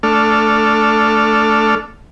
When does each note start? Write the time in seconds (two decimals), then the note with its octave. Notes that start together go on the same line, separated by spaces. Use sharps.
0.03 A3 D4 A4 F6